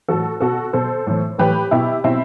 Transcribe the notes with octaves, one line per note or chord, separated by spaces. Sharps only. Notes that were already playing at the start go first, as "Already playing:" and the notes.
A2 E3 F#4 A4
B2 F#4 A4
B2 A4 C5
A2 E3
A2 E3 G4 B4
B2 E4 G4
B2 C4 E4